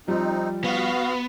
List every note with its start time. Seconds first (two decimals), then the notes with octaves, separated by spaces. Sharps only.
0.08 F3 G3 C4 D#4
0.64 B3 F#4 F5